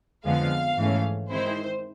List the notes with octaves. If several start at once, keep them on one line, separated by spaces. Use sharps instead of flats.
F2 D3 F3 G#3 B3 F5
G#2 E3 A3 C#4
D#3 G#3 C4 E4 C5